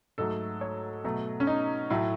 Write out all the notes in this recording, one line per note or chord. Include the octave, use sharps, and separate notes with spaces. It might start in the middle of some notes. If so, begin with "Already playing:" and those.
G#2 F#3 A3 A4
C#5
B2 F#3 A3
C#4
D#4
A2 F#3 A3